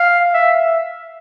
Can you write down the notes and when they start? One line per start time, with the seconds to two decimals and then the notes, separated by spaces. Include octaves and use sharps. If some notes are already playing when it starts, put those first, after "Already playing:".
Already playing: F5
0.34 E5